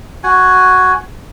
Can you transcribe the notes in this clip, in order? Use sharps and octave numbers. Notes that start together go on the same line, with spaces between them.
F#4 G#5